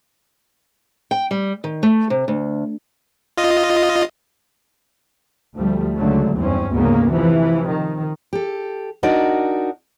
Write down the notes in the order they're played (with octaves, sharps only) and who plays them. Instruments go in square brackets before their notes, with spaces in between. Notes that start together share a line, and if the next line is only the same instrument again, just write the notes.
[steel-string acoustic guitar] G5
G3
D#3
A3
C3
D2
[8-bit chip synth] F4 D#5
[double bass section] D2 F3 G3 A3
C#2 D3 F#3 A3
F#1 E2 G2 C4 C#4
F#1 D2 G#2 C#3 A#3 B3
C3 E3 F3
D#3
[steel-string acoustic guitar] G4 A4
D4 D#4 F#4 A#4 D5